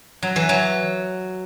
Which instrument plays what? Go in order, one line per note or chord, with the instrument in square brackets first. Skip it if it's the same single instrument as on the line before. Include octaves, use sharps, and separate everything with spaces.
[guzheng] F#3
E3
F#3